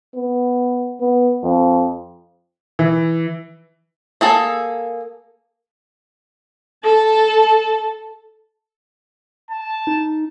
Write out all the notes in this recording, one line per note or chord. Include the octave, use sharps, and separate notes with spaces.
B3
B3
F2
E3
A#3 G#4 A4
A4 A5
A5
D#4